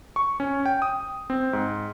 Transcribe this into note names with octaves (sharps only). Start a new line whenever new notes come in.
C#6
C#4
G5
D#6
C4
G#2